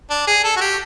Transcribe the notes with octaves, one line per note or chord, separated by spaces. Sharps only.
D4
G#4
A4
F#4
G4